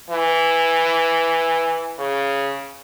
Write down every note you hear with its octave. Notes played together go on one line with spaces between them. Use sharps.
E3
C#3